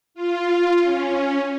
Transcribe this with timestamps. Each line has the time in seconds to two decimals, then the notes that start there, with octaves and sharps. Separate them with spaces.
0.14 F4
0.82 C#4